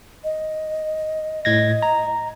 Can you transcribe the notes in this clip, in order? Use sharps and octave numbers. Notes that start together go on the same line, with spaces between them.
D#5
A2 D#5 G#6 A#6
A#5